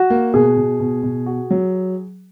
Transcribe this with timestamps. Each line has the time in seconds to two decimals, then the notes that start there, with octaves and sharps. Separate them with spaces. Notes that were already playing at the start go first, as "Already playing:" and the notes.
Already playing: F#4
0.10 A#3
0.34 B2 G#4
0.57 B2
0.80 B2
1.03 B2
1.26 F#4
1.51 F#3